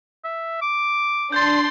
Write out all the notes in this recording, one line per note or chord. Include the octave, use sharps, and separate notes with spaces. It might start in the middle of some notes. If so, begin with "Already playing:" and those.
E5
D6
D4 C6 G6 A6